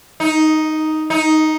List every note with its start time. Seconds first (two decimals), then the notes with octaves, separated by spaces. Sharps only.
0.20 D#4
1.10 D#4